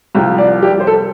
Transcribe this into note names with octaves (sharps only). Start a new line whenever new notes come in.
C2 C3 F3 G5
D5
G4
C5
A4